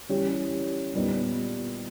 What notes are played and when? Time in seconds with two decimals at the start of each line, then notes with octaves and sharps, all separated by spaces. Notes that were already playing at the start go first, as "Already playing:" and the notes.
0.09 E3 G3 C#4 G4
0.94 A#2 G3 B3 D#4